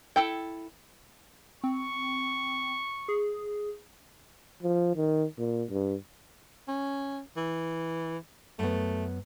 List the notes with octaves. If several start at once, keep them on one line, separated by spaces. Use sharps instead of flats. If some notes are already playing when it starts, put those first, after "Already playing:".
E4 A4 G5
C4 C#6
G#4
F3
D#3
A#2
G2
C#4
E3
F#2 A3 B3